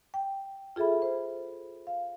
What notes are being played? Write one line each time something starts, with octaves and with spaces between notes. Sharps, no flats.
G5
F4 G#4 A4 E5 B5
C5
F5